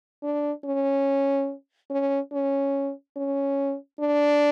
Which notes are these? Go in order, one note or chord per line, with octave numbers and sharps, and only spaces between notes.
D4
C#4
C#4
C#4
C#4
D4